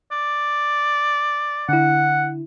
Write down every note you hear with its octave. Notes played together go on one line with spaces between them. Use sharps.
D5
D3 E4 F#5